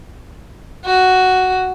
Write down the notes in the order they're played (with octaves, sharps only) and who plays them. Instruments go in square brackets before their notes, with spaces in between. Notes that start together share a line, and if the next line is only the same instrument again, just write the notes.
[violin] F#4